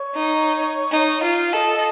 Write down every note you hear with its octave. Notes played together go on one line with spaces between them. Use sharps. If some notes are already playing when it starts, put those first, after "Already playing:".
Already playing: C#5
D#4
D#4
F4
A4 D#5
D#5